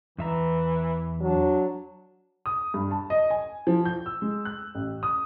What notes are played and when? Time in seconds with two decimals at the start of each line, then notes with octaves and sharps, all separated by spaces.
0.18 E2 E3 E5 A#5
1.21 F#3 D4
2.46 D#6
2.74 G2
2.91 A5
3.10 D#5
3.30 G#5
3.67 F3
3.85 G6
4.06 E6
4.22 G#3
4.45 F#6
4.75 A1
5.03 D#6